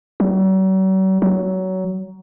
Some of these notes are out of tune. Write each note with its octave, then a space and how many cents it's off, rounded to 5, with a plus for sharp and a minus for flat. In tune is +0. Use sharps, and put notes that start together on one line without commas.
F#3 +45
F#3 +20